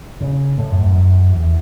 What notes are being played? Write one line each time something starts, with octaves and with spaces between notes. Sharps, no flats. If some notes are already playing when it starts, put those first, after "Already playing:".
C#3
A2
F#2
F#2
F#2
E2